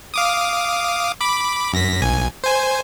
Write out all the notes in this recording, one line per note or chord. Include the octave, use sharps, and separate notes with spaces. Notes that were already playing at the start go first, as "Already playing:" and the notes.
F5 D6 D#6
B5 D6
F#2 A#6 B6
B1 G#5
C5 G#5